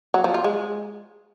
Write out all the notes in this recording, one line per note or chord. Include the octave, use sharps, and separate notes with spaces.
F#3
F3
F4
G#3